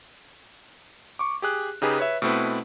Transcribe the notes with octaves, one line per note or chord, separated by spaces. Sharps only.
C#6 D6
G4 G#4 F#6
C#3 D#4 G4 G#4 B4
B4 C#5 E5
B2 A3 C4 E4 B4